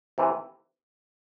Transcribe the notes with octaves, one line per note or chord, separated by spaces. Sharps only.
C3 E3